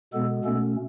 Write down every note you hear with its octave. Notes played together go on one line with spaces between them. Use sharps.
B2 G#3 B3 A4
B2 A3 C#4 A4